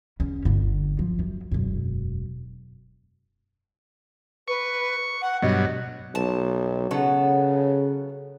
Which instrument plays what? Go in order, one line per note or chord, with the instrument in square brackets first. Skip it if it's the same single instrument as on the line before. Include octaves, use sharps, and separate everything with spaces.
[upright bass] E2 C#4
G1 D3
F3
F#2
E1 F#2
[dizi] B4 [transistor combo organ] C#6
[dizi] F#5
[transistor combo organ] G2 B2 F#3 [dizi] D#5
[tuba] B1 [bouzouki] A5
[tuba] C#3 [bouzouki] F#3 B3 A4